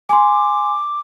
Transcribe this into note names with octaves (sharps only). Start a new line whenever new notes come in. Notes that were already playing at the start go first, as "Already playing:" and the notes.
G#5 C6 D6